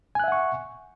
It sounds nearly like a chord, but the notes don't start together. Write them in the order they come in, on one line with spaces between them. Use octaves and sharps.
G#5 F#6 E5 F#5 C#6